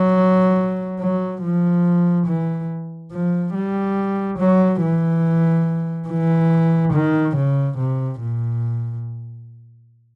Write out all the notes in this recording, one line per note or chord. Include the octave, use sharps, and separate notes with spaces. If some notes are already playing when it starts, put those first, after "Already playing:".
Already playing: F#3
F#3
F3
E3
F3
G3
F#3
E3
E3
D#3
C#3
C3
A#2